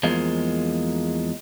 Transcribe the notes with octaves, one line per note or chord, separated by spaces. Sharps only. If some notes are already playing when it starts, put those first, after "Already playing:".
E2 F3 G#3 A#3